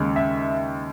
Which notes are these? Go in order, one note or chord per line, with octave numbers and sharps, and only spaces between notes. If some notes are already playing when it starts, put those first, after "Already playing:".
Already playing: D#2 C#3 G#3
E5